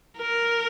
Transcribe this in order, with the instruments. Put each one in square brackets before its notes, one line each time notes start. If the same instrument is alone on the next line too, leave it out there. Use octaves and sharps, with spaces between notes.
[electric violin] A#4